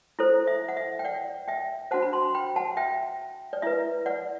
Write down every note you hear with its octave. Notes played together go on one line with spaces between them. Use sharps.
E4 A4 C5
E5
F#5
E5
G5
D5 F#5
E5 G5
D4 F#4 C5 F#5 A5
B5
A5 C6
G5 B5
F#5 A5
E5 G5
D5
E4 B4 E5
D5 F#5